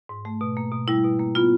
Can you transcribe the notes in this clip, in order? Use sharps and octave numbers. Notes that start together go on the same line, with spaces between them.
G#2
A3
B2
A#3
B2
G3 E4
B2
A#3
B3 F4